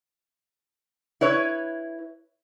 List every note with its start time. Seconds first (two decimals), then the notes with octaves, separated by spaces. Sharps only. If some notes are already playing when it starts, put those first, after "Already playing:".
1.21 E4 B4 C#5